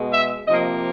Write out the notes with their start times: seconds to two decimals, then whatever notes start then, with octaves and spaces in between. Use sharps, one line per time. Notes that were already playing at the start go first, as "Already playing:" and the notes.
Already playing: B2 G#3
0.14 E5
0.47 C3 F3 A#3 D#5